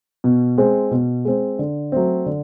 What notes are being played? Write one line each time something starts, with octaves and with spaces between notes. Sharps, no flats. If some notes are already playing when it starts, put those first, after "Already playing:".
B2
G#3 C4
B2
G#3 C4
D3
F#3 A3 C4
D3